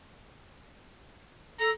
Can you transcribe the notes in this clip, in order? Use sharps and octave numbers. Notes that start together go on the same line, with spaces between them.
A4 A#5